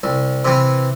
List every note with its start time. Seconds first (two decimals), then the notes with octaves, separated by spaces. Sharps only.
0.03 C2
0.45 C3 E3